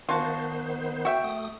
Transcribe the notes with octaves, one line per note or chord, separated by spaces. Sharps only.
D#3 B3 F4 F#4 C5 A5
F#4 E5 G5
A3 D#6